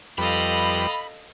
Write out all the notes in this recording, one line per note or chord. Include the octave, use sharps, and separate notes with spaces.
F2 G3 A4 B4 D#5 F5 B5